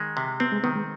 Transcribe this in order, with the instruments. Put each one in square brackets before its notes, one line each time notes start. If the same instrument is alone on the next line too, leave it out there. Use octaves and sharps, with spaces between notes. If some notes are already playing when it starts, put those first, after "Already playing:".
Already playing: [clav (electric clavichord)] D#3 G#3
C3
[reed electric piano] B3 [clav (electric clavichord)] C4
[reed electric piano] G#3
[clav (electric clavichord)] D#3 [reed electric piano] B3
[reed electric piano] G#3